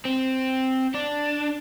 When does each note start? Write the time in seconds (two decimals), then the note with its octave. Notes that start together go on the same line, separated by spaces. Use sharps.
0.05 C4
0.95 D4